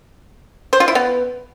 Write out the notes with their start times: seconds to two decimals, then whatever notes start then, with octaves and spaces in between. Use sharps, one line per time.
0.73 C5
0.80 F4
0.88 E4
0.95 B3